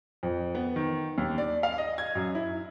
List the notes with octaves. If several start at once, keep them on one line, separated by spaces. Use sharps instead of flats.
F2
B3
D#3
D#2
D5
F5
D#5
G#6
F#2
E4